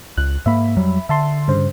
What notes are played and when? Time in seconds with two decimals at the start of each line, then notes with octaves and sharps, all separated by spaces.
0.17 C#2 F#6
0.46 G#2 A#3 E5 B5
0.77 F2 F#3 G3
1.09 D3 E5 A5 C6
1.48 G2 C#3 C5